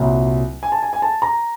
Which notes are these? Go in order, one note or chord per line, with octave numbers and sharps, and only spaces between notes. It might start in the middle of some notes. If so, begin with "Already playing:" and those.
Already playing: C2 A#2 F#3
G#5
A5
G#5
G#5
A5
A#5